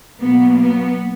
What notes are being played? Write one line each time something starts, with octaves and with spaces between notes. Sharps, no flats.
B2 F#3 A#3 B3
B3